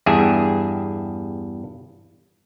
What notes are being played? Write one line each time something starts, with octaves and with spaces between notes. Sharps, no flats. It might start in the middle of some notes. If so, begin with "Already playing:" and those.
E2 G2 G4 G#4 E5 G#5